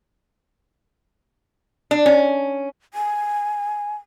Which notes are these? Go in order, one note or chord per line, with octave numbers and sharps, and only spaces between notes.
D4
C#4
G#5